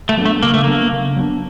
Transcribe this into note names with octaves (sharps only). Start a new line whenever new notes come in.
A3
F#3 B3 D4
A3
C#3 A#3
A3
F#3 A#3 B3 D4
C#3
F#3 B3 D4